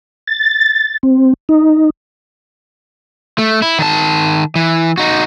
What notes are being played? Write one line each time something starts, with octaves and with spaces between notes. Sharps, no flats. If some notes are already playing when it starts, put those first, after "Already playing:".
A6
C4
D#4
A3
E4
D#3 A5
E3
D#4 F#4